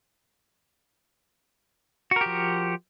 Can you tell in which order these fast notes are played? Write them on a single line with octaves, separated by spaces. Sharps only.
F#4 A#4 G4 F3